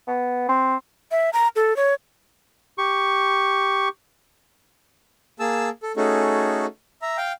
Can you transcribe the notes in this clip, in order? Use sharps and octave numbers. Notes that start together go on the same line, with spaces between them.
B3
C4
E5
A#5
A4
C#5
G4 C#6
A#3 G#4 A5 E6
A4
A3 C#4 D#4 F#4 G#4 A4
E5 A#5
F5 G5